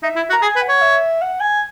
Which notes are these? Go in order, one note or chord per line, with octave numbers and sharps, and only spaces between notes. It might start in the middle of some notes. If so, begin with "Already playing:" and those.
D#4 E5
E4
F#4
A#5
G#4 G#5
B4
F#5
C#5
E5
F#5
G#5